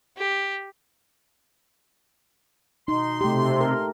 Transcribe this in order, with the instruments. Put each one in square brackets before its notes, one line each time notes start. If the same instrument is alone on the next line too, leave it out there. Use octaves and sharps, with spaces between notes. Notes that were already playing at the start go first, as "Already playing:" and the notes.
[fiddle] G4
[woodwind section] B2 C6 [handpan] D#4
[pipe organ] C3 [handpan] A3 G4
[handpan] A#4